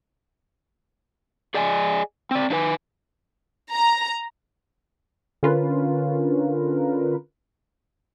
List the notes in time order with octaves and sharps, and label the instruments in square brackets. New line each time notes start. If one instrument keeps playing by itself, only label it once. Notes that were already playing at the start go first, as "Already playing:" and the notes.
[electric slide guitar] G#4 D5 D#5 G#5
C4 D5
D4 D#4 B4 G#5
[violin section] A#5
[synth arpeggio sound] D3 C#4 F4 A#4 B4